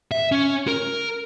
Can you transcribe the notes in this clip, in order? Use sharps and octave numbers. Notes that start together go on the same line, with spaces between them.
E5
C#4
A#4